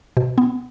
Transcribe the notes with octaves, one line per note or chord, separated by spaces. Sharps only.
B2
B3